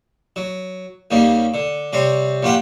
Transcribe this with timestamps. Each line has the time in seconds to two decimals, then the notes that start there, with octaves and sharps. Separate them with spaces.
0.36 F#3
1.11 D#2 C#3 G3 A#3
1.54 D3
1.93 C3 G3 C4 C#5
2.43 A#1 G2 F4 G4 F#5 G5